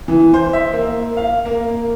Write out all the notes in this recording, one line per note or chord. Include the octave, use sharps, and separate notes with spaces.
E3
C5
E5
A#3
F5
A#3